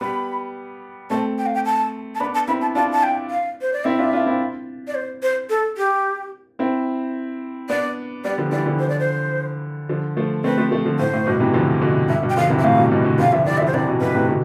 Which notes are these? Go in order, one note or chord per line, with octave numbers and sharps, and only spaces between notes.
G3 B3 B5
A3 C4 A5
G5
F5
G5
A5
A5
B3 D4 B5
A5
C4 E4 B5
A5
D4 F4 A5
A5
G5
F5
C5
D5
C4 E4 E5
D4 F4
D4 F4
C4 E4
D5
C5
C5
A4
G4
C4 E4
B3 D4 D5
G3 B3 D5
D3 F3
E3 G3 D5
D3 F3
C5
D5
C5
D3 F3
F3 A3
A3 C4 B4
F3 A3
F3 A3
D3 F3
A2 C5
A2
G2 B2
C3 E3
D3 F3
B2 D3
G2 E5
G2 B2
G5
D3 F3 F5
C3 E3
E5
A2 C3 F5
G2 B2
G2 B2
B2 D3
C3 E3 F5
D3 F3 E5
E3 G3 D5
D3 F3 E5
C5
C3 E3 D5
B2 D3
G2 B2 B4
A2 C3
B2 D3